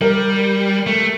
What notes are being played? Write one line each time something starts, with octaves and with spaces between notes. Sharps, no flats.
G3 A#4
A3